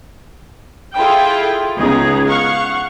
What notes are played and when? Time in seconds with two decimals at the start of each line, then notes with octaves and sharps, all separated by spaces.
0.96 E4 F4 G#4 A4 G5
1.77 C#2 C#3 B3 D#4 G#4
2.29 F5 F#5 C#6